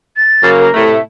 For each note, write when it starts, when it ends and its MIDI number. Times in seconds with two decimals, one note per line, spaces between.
0.16 0.50 93
0.42 0.68 49
0.42 0.68 54
0.42 0.68 58
0.59 0.84 70
0.74 0.98 45
0.74 0.98 48
0.74 0.98 57
0.88 1.01 76